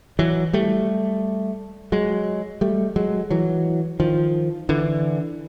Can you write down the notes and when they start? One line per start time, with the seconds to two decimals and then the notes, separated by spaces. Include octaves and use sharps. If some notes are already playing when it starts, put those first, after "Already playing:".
0.19 E3 F#3
0.53 G3 A3
1.92 F#3 G#3
2.61 G3 A3
2.96 F#3 G#3
3.30 E3 F#3
4.00 D#3 F3
4.69 D3 E3